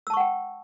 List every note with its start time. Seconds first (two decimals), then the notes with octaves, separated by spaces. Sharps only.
0.07 E6
0.10 A5
0.13 C#6
0.17 F#5
0.20 G5